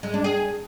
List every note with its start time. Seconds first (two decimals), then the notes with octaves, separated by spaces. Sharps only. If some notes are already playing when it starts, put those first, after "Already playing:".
0.03 G#3
0.14 D4
0.24 G#4